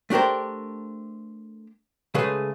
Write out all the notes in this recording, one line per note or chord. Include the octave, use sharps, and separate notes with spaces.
A3 D4 G4 A#4 C5
C#3 G#3 A3 G#4 B4